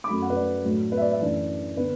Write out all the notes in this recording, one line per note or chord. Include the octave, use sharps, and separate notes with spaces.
D6
F#2 F#3 A3 B5
F#5
B4
D5
A2 F#3 A3 D4
B4
E5
D5
E5
F#2 E3 A3 D4 D5
D3 B3 D4 B4